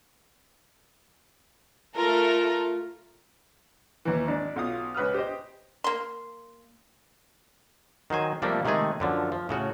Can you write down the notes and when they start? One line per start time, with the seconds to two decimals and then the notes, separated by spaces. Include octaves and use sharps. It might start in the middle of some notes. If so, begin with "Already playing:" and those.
1.96 A3 F4 A4 A#4
4.05 D#2 E3
4.28 G#1 D4
4.56 B1 F4 D#6
4.94 C#2 B4 D#6 F6
5.14 G4 C5 D#5
5.84 A#3 C6
8.10 D#3 F#3 C5 G#5
8.42 C3 F3 G3 A3 A#3
8.65 C3 D#3 G#3 A3 G#4
9.00 F#2 D3 F3
9.32 F3
9.49 A2 C#3 F#4